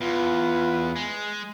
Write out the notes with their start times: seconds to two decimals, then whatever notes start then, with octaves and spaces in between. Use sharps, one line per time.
0.01 E2 F4 B4
0.96 G#3